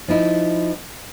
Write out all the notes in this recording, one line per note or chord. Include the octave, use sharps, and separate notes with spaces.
F3 D#4 E4